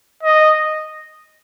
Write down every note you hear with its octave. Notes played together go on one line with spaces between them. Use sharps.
D#5